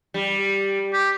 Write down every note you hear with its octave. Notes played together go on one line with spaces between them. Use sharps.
G3
G4